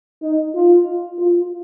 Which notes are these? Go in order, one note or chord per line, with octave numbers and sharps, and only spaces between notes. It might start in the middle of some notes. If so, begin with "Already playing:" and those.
D#4
F4
F4